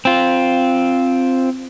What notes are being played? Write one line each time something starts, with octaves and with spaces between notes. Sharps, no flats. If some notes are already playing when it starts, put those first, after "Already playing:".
C4 F4